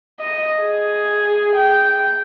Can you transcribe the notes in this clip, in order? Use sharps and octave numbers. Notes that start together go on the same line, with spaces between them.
D#5
G#4
G5